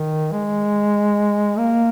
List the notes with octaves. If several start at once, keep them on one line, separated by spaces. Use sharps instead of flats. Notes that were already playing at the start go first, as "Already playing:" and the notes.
Already playing: D#3
G#3
A#3